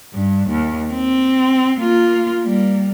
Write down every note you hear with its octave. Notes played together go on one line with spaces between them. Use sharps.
G2
D#2
C4
A#3 F4
G3 A#3